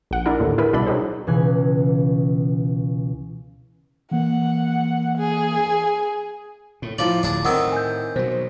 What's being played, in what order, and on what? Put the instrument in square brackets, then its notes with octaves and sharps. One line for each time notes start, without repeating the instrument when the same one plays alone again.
[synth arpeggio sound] A#1 F#5
D4 E4 A#4
D#2 A2 D3
E4 G#4 A#4 B4 B5
C2 B2 D4 E4 B5
F#3 D4 D#4 G#4 C5
[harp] C#2 B2 E3 G#5 F#6
[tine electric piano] E3 A#3 [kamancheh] F#5
[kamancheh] G#4
[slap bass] A2
[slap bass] A2 [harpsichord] F3 D5 [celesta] E4 D6 F#7
[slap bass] D1 [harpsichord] D4 G#4
[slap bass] A2 [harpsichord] D#3 C4 [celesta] F#5 D#6 E6
[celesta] G#5 G6
[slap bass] B2 F#3 [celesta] C5